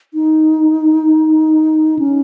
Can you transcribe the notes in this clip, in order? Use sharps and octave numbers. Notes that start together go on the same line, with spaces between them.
D#4
C#4